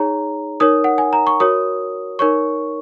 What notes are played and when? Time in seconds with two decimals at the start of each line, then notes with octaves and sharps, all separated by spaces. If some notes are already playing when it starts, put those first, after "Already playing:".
Already playing: D#4 G#4 C#5 A#5
0.60 D#4 A#4 C#5 D#6
0.84 F#5
0.98 G#5
1.13 A#5
1.27 C#6
1.40 F#4 A#4 C#5 D#6
2.19 D#4 A#4 C#5 C#6